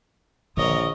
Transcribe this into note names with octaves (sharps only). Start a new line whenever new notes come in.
A#1 D3 D#3 A#4 C#5 D#5